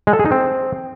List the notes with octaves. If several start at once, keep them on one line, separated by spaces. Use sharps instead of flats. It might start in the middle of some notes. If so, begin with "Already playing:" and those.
G#3
A4
G#4
D#4
C4